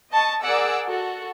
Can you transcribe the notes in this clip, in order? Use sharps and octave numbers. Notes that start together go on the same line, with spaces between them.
D#5 A5 C#6
G#4 A#4 D5 F#5 D6 E6
F#4 A4